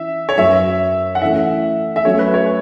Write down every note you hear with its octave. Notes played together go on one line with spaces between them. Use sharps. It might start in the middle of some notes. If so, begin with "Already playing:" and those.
Already playing: E3 C#4 E4 E5
C#5
F#2 F#3 C#4 F#4 B4 E5
F#5
E3 A3 C#4 A4 E5
E5
F#3 A3 C#4 F#4 A4 C#5
B4
C#5